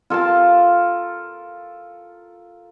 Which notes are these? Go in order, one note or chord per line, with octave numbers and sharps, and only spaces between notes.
F4 A4 A#4 A5